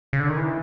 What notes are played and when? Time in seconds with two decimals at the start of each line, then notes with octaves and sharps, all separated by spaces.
0.13 C#3
0.20 D3
0.29 D#3
0.37 E3